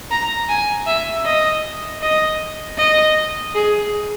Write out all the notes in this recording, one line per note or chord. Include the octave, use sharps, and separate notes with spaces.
A#5
G#5
E5
D#5
D#5
D#5
G#4